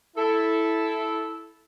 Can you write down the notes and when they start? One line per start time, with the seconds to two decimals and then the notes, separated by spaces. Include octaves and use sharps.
0.16 E4 A4